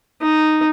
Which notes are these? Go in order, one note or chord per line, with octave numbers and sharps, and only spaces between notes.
D#4